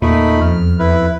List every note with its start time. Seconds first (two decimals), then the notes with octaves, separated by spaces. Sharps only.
0.02 E2 A#2 A3 D#4 B5
0.41 F2 F6
0.79 E4 B4